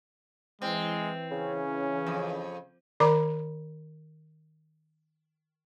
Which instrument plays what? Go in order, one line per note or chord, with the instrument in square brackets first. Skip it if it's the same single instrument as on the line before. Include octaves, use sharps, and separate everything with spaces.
[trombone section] E3 [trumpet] G#3 [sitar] C4
[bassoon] C#3 [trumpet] C#4
[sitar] F2
[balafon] D#3 A#4 D5 A#5 B5 D6